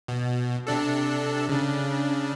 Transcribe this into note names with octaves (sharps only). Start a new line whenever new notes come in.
B2
C3 D4 A4
C#3 D4